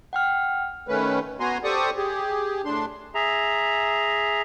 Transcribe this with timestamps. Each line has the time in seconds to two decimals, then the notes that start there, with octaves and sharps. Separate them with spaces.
0.13 F#5 G5 F6
0.88 D#3 A3 C#4 B4
1.40 B3 F#4 G#5 A#5 C6
1.64 G4 A4 C5 D5 C#6 D#6
1.96 G4 G#4
2.65 A2 D4 C6
3.15 G#4 E5 A#5